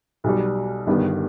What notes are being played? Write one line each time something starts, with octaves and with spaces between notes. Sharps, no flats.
B1 B2 G3
G1 G2 D#3 G3 B3